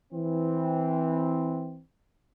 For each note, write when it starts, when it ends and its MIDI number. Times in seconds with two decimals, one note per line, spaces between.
0.13 1.80 52
0.13 1.80 60